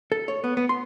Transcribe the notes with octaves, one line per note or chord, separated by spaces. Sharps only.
A4
C#5
B3
B3
C6